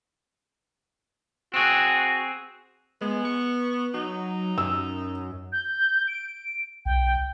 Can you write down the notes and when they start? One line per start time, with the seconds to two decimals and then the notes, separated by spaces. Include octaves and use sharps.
1.54 C4 F#4 G#4
3.01 G#3 B3
3.25 C#6
3.94 F#3 D#4
4.58 F#2 E6
5.53 G6
6.08 D7
6.86 B1 G5